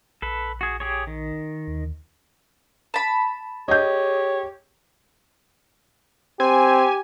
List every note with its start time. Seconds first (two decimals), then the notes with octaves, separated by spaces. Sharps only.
0.22 A#1 A4 B4
0.61 F#4 G#4
0.80 G4 G#4 C#5
1.07 D#3
1.67 D#2
2.94 A5 B5
3.68 G4 G#4 C#5 D#5 G6
6.40 C4 G4 G#5